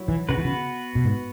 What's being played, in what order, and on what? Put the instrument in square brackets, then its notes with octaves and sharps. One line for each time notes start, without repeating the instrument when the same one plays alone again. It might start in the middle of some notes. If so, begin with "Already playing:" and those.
Already playing: [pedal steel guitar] F#3 E4
[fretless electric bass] E3
[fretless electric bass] C#3 [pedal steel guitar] B3 F#4 B4
[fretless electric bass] E3
C#3
B2
G#2